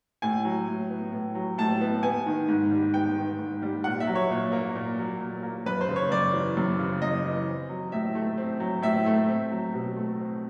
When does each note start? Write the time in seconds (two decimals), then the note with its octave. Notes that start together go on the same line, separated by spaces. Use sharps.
0.22 A2 G#5
0.45 F#3
0.68 A2
0.90 B3
1.12 A2
1.35 F#3
1.58 A2 A5
1.81 B3
2.03 B3 G#5
2.26 D#3
2.48 G#2
2.71 G3
2.94 B3 G5
3.17 D#3
3.39 G#2
3.62 G3
3.84 A#2 F#5
4.00 E5
4.07 F#3
4.15 C#5
4.31 A#2
4.52 A#3
4.75 A#2
4.98 F#3
5.20 A#2
5.43 A#3
5.66 F#2 B4
5.81 C5
5.88 C#3
5.96 C#5
6.11 F#2 D5
6.33 E3
6.57 F#2
6.79 C#3
7.02 F#2 D#5
7.25 E3
7.46 C4
7.69 F#3
7.92 A2 E5
8.15 A3
8.38 C4
8.60 F#3
8.82 A2 E5
9.06 A3
9.28 C4
9.51 F#3
9.74 B2
9.97 A3
10.19 C4